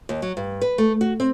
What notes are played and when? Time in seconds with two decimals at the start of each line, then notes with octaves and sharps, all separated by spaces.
0.09 D#2
0.22 F#3
0.37 G2
0.61 B4
0.78 A3
1.01 F#4
1.20 C4